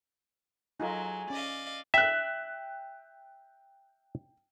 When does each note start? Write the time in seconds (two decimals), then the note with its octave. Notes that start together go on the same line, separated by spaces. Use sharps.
0.80 F#3 D#4 F4 G#4 A4
1.30 C#4 D5 D#5 F5
1.94 E5 G5 F#6